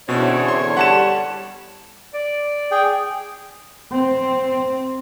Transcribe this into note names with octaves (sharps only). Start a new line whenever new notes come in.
E2 B2 D3 E3 C4 C#4 C#5
C6
G3 F#5 A5 E7
D5
G#4 G5
C4